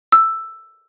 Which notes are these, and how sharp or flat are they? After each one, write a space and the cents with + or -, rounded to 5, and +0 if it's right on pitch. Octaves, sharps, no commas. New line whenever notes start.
E6 +5